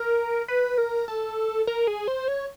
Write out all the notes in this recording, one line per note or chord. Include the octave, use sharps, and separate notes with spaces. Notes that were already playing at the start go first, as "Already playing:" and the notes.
Already playing: A#4
B4
A#4
A4
A#4
G#4
C5
C#5